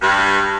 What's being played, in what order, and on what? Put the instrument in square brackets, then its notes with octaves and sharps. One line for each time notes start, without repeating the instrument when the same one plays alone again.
[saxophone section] G2